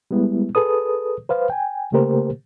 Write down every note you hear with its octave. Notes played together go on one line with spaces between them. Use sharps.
G3 G#3 B3 E4
G#4 A4 B4 D#6
B4 C5 F5
G5 G#5
C#3 A3 A#3 G4 A#4 C5